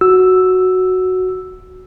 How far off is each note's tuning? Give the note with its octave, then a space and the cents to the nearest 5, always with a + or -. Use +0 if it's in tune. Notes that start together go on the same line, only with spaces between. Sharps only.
F#4 +0 E6 +0